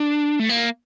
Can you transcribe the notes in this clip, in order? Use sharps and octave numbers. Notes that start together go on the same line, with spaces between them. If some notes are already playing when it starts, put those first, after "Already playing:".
Already playing: D4
A3
A#3